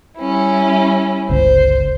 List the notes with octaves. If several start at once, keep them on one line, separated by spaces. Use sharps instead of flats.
G3 C#4 E4
G1 C#2 C5